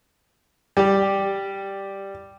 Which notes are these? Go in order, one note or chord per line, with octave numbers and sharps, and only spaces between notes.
G3 G4